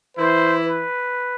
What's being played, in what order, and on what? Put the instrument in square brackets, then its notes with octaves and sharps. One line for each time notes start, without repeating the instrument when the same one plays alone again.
[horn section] E3 E4 [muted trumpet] C5
[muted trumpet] B4